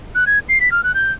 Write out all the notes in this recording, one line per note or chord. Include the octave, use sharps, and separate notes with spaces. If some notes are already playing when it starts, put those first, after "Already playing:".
F#6
G#6
C7
B6
F6
F#6
G6